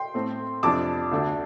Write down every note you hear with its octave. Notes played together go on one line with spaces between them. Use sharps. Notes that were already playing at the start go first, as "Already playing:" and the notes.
Already playing: G5 C6
A2 A3 C4
F2 C3 F3 D4 A5 D6
D2 D3 A3 D4